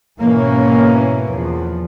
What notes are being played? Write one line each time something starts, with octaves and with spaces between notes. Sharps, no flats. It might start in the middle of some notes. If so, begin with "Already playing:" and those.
G#2 B2 E3 A#3 C#4
E2 F3